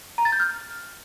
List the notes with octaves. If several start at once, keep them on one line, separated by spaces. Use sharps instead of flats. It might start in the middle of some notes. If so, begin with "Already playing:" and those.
A#5
A6
G6
F6